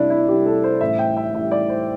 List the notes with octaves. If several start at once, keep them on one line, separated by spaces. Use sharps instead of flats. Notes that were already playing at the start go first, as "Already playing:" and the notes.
Already playing: C2 C3 G3 D4 E4
E4
C2 C3 G3 G4
A4
C5
A1 A2 G3 E5
G5
E5
A1 A2 G3 E5
D5
C5